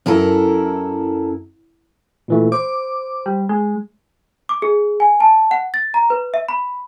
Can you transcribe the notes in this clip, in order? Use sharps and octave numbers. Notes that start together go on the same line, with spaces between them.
F#2 E4 A4 A#4
A#2 E3 A3
C5 D6
G3
G#3
D6
G#4
G#5
A5
F#5
A6
A#5
B4
E5
B5